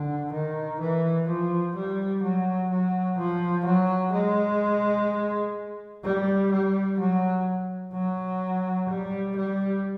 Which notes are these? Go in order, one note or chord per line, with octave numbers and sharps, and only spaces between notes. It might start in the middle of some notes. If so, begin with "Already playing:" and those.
Already playing: D3
D#3
E3
F3
G3
F#3
F#3
F3
F#3
G#3
G3
G3
F#3
F#3
G3
G3